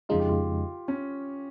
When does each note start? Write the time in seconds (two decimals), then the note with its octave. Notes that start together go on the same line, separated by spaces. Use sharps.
0.09 F2 C#3 G#3 D#4 F4
0.19 G4
0.29 F4
0.88 C#4